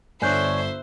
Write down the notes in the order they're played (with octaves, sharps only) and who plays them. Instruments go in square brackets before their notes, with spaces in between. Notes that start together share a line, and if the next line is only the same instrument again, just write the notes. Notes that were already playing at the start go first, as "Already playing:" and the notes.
[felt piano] G1 F#6 [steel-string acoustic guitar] D3 C#5 [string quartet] C5 E5 [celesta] G#5 G6